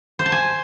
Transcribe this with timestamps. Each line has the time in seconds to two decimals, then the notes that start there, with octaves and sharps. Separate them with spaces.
0.19 C5
0.26 A5
0.32 G#5